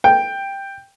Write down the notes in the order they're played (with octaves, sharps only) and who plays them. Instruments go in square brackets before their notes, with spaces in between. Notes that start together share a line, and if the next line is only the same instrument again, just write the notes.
[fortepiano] G5